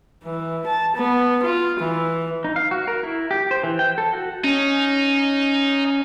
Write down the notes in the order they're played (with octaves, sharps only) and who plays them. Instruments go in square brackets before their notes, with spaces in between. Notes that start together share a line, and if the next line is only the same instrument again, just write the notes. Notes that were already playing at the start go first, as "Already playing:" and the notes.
[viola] E3
A5
B3
F4
E3
[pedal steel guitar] D#4
F5
F#4
A#4
E4
G4
C5
E3
G5
A4
F#4
[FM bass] C#4 [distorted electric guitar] D#4